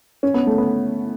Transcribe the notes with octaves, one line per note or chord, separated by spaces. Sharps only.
C#4
B3
A3
B3